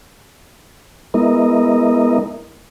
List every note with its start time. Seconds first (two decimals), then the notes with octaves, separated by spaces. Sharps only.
1.14 G#3 B3 E4 A#4 D#5